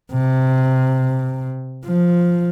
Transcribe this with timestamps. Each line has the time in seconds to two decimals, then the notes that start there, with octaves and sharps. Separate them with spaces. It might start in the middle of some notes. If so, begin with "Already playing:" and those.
0.12 C3
1.86 F3